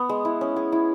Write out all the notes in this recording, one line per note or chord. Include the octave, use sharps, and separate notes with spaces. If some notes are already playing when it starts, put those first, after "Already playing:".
Already playing: B3
G#3
E4
C#4
G#4
E4